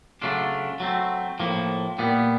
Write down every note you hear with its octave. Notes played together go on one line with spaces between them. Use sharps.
C#3 F#3 A3 D4 F4
F#3 A3 C4
A2 F3 A#3
A#2 G3 B3